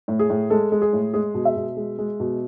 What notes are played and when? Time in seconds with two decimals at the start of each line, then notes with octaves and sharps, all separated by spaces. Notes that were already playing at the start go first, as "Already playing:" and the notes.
0.08 A2
0.19 G#4
0.30 A2
0.50 G#3 A4
0.72 G#3
0.82 G#4
0.93 A2
1.14 G#3 G#4
1.34 B2
1.45 E5
1.56 B2
1.77 G#3
1.98 G#3
2.20 B2